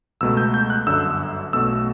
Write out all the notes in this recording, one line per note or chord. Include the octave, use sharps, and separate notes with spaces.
C#2 B2 A3 E6
G6
G6
F#6
G1 F#2 D3 E6
B1 B2 A3 E6